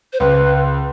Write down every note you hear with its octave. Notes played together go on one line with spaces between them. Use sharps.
C5
C#2 B4